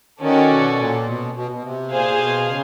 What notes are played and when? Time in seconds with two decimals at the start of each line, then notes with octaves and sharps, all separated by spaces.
0.21 D#3 C#4 F#4 A4 D5
0.50 B2
0.78 A#2
1.06 B2
1.34 B2
1.51 B2
1.63 C3
1.91 A#2 G#4 C5 F5
2.13 A#2
2.19 B2
2.48 C#3